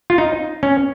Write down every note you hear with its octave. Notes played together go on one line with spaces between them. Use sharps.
F4
D#4
C#4